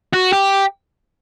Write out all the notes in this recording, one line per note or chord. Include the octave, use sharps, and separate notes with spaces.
F#4
G4